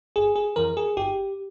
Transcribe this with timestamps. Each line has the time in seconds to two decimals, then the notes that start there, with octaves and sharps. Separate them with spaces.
0.16 G1 G#4
0.36 G#4
0.56 F2 E3 A#4
0.77 G#4
0.97 G1 G4